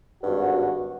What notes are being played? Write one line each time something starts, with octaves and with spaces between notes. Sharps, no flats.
G#1 G2 F#4